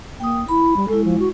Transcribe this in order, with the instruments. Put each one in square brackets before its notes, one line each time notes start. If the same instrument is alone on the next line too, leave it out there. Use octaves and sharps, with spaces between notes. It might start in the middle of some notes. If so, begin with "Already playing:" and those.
[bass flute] A#3 [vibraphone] G5 D#6
[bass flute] E4 [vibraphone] B5
[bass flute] G3
[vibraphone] G#3 E4 [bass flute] A4
[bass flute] F3
F#4